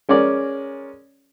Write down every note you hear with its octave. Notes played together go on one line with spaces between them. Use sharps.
G#3 C#4 A#4 D5